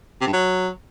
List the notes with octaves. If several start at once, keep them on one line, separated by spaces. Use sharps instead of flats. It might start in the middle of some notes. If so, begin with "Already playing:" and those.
C3
G2
F#3